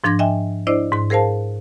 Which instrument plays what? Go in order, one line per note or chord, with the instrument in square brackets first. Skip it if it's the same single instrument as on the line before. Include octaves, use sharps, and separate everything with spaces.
[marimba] G#2 F3 D4 C6 G#6 A#6
D#5 E5 G5 G#5
D4 E4 C5 D5 D#5
G#2 C6
G#4 A#4 C5 F5 A5